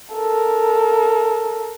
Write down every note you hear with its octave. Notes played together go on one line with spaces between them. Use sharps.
A4 A#4